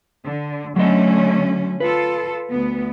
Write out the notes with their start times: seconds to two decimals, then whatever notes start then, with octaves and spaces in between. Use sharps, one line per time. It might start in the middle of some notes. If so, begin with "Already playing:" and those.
0.24 D3
0.76 D3 F#3 A3 C#4 D#5
1.80 F4 A4 B4
2.49 D2 B3